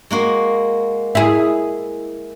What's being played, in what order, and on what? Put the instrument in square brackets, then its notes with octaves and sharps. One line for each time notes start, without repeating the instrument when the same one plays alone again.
[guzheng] G#3 A#3 F#4
[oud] E4 G#4